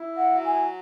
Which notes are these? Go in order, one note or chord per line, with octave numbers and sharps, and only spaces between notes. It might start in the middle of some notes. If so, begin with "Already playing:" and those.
Already playing: E4
F#5
F#3
G#5